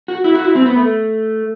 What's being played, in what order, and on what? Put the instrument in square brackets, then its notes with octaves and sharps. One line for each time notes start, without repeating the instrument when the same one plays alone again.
[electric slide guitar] F#4
E4
F#4
E4
C4
B3
A3